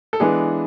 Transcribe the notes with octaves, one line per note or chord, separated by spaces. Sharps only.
A4
E3 G#3 B3 D4 G#4